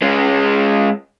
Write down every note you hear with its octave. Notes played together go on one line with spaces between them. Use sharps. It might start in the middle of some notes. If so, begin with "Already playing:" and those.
G#3 C#4